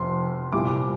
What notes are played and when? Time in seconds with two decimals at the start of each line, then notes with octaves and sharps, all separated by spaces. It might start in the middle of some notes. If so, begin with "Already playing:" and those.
Already playing: F1 F2 C6
0.52 C2 A#2 G3 D6